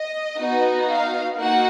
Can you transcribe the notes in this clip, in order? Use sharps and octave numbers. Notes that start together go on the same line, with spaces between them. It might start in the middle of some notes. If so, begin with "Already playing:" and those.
Already playing: D#5
B3 D#4 F#4
F5
A#3 D#4 F#4 F#5